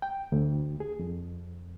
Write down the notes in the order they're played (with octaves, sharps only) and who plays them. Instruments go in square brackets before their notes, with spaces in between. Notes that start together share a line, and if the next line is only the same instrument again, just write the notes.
[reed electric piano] G5
D2
G#4
F2